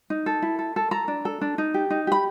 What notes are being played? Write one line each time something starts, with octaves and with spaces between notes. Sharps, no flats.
D#4
A4
E4
A4
A4
A4 A#5
D4
A4
D4
D#4
G4
D#4
G4 B5